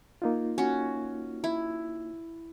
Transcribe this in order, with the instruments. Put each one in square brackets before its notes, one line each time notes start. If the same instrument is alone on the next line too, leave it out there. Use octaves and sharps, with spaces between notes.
[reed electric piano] A#3 D#4 F4
[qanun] C#4 F#4
E4